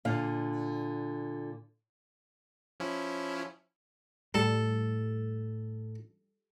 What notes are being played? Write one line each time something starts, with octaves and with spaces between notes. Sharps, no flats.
A#2 D3 F5
F3 C#4 E4
A2 G3 A4